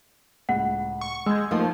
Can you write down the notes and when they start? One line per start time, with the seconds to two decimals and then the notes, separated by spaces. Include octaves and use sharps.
0.49 C#2 A2 F#5
1.01 C#6
1.26 G#3 E6 G6 G#6
1.51 F3 A3 A#3 D#4 D#5 F5 C6